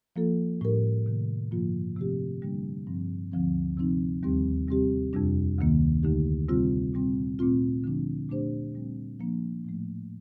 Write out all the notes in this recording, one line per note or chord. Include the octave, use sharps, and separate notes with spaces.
F3 A#3 F4 A4
A2 G3 D4 G4 A#4
C3 D#3 A3
G2 D3 F3 A#3 F4
C3 F3 A3 C4 G4
D3 G3 A#3 D4
G2 F3 C4
D2 D3 F3 C4
C3 F3 C4 D#4
D#2 D#3 G3 C4 G4
C3 G3 C4 G4
F2 C3 G3 D4
D2 C3 D#3 A#3
D2 D3 A3 D#4 G4
C3 G3 C4 F4
A#2 G3 C4
A#2 A3 C4 F4
D3 F3 A3 D4
A#2 A3 D4 G4 C5
A#2 G3 C4
F3 A#3 D4
A2 F3 A3